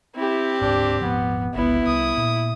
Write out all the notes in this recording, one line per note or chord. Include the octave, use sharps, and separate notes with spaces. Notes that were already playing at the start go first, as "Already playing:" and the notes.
C4 E4 G4
D1 G#1 G#2 D4
D#1 G#2 F3 B3
G1 C#2 B3 E4
C2 D#6
A#2